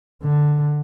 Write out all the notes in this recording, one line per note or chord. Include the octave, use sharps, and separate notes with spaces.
D3